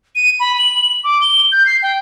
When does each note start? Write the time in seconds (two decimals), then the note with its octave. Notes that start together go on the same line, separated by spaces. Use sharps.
0.15 D#7
0.40 B5
0.59 F#7
1.04 D6
1.22 G7
1.52 G6
1.66 C7
1.83 G5